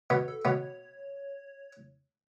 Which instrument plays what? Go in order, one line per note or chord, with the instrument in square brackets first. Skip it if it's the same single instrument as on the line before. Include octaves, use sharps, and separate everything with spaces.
[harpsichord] B2 B3 [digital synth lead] C#5
[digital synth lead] A4
[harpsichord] B2 B3 [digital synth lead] C#5